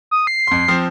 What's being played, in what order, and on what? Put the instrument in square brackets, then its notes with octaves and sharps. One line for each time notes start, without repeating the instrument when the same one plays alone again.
[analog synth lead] D#6
C7
[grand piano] F2 C6
F3 C4